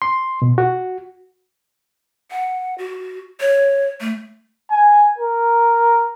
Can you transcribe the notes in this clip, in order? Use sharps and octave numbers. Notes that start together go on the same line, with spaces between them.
C6
B2
F#4
F#5
F#4
C#5
A3
G#5
A#4